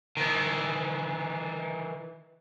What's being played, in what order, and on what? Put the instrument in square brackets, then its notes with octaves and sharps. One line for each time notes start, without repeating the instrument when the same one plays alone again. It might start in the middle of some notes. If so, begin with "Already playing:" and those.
[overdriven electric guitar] D#3 E3